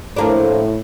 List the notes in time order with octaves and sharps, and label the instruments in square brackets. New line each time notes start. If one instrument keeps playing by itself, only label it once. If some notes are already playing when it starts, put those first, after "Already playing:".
[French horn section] A2 [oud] F3 A#3 D4